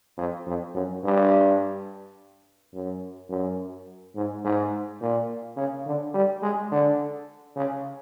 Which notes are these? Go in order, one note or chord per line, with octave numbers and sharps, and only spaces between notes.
F2
F2
F#2
G2
F#2
F#2
G#2
G#2
A#2
C#3
D3
G3
G#3
D3
C#3